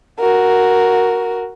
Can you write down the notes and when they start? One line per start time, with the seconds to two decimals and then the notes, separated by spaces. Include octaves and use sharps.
0.20 F#4 A#4